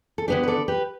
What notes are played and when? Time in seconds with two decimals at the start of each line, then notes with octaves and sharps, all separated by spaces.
0.18 A4
0.28 D3 B3 D4 G4
0.43 B4
0.48 A4 D5
0.68 G4 B4